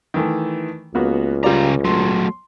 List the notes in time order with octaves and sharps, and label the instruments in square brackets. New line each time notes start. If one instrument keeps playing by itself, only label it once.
[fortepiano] D#3 E3 A3
[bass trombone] C#2 [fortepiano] A#3 B3 F#4
[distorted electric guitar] C#3 A#5 [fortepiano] G3 F4 D5
[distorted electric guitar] F#3 A3 [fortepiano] C6